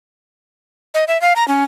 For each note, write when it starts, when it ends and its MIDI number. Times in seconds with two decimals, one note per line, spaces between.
0.94 1.04 75
1.08 1.20 76
1.21 1.33 77
1.36 1.46 82
1.48 1.64 61